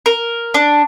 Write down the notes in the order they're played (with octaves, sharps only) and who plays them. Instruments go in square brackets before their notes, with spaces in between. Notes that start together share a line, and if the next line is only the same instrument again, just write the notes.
[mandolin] A#4
D4